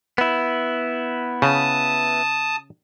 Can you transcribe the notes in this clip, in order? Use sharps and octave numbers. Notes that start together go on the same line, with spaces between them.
B3 E4
C#3 A5 D#6